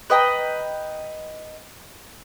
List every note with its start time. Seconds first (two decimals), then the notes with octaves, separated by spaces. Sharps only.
0.10 B4 D#5 G5 A#5